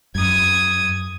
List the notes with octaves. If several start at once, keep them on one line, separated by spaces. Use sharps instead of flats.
F#2 D#6 G#6